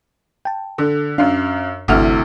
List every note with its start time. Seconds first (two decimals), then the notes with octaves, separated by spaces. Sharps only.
0.45 G5 A5
0.78 D3
1.18 F#2 D4 F5
1.88 G1 D2 C3 E3 F#5 F6